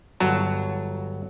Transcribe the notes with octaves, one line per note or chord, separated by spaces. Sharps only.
G1 F#3 A5 A#5